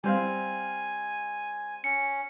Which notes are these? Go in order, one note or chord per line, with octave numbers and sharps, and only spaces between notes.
G3 C4 F5 G#5
C#4 C#7